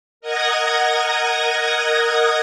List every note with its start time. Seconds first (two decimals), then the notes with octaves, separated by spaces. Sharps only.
0.21 A#4 D#5 F#5 D#6 G#6 A#6